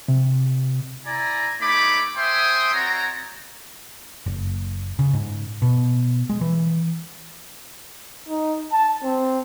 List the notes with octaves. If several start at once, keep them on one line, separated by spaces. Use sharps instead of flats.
C3
E4 D5 G#5 A#5
A3 D#4 C#5 B5 D6
C5 E5 G5 G#5 C6 D#6
C4 F#4 C#5 D5 A#5
F#1
C#3
G#2
B2
G#3
E3
D#4
A5
C4